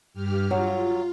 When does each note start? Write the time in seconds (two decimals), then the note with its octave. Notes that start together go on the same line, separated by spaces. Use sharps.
0.14 G2 G4 F6
0.51 F#3 F4